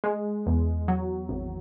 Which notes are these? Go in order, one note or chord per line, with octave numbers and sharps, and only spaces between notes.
G#3
E2
F#3
G#1